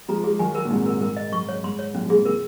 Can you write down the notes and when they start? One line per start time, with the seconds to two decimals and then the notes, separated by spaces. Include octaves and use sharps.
0.09 F3 G#3 A#5
0.24 G#3 G#4
0.39 D#3 F#3 G#5
0.55 A#4
0.65 A#2
0.70 G#2 C3 D#4
0.86 A#4
1.01 G#2 A#4
1.17 D#5
1.32 F#2 C#6
1.49 C#5
1.64 G#2 C6
1.79 C#5
1.94 F#2 A#2 C#4
2.05 F#2 A#2
2.10 G#4
2.15 G#2 C3
2.25 A#2 C#3 A#4